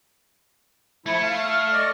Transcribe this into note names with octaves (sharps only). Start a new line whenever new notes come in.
F3 A3 E4 G#6
F5
F6
D5 D#5 C#6